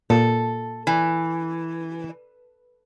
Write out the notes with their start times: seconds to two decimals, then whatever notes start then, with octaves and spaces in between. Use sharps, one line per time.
0.10 A#2 A4
0.87 E3